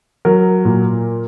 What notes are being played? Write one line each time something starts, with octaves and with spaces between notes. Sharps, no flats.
F#3 A#4
A#2